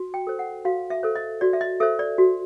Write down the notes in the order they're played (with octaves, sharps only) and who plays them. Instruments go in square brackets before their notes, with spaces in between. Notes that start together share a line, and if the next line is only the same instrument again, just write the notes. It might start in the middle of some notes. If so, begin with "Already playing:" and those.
Already playing: [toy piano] F#4
G5
A4 C5
F#5
F#4 F5
E5
A4 C5
D#5
F#4 D5
E5
D#5
A4 C5 E5
D5
F#4